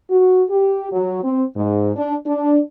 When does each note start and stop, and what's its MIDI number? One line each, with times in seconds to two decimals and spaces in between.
0.10 0.44 66
0.51 0.88 67
0.92 1.21 54
1.24 1.44 60
1.57 1.92 44
1.96 2.15 62
2.26 2.60 62